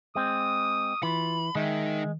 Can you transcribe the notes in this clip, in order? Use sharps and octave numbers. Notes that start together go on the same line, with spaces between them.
G#3 C4 D#6
E3 F4 B5
D#3 G#3 D#4 E5